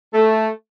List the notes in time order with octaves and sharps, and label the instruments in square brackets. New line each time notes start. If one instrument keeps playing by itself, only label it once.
[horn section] A3